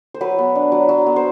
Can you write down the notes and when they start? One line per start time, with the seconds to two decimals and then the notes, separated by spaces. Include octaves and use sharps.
0.14 C5
0.21 F#3 B4
0.39 B3
0.55 D4
0.72 F#3
0.89 F#3
1.07 B3
1.16 C5